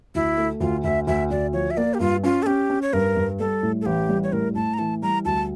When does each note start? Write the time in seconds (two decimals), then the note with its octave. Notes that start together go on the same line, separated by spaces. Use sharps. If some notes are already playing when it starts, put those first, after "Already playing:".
0.15 D2 E4
0.37 A3
0.61 D2 F4
0.84 D2 E5
1.07 D2 E5
1.31 D2 D5
1.53 F3 C#5
1.71 E5
1.77 A#3 D5
1.94 G4
2.00 G2 F4
2.23 C#4 F4
2.43 A4
2.46 C#4 G4
2.70 C#4
2.82 C#5
2.93 G2 A#4
3.16 G2
3.39 G3 A4
3.63 A2
3.81 A4
3.86 A1 G4
4.09 G3
4.23 C#5
4.32 A2 A#4
4.55 A2 A5
4.74 A#5
4.79 E3 A5
5.02 G3 A#5
5.25 D2 A5